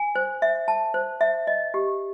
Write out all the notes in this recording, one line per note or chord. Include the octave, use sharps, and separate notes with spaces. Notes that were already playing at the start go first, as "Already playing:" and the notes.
Already playing: G#5
C5
E5
A5
C5
E5
D#5
G4